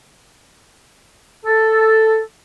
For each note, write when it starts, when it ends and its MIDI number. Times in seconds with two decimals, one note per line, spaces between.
1.45 2.20 69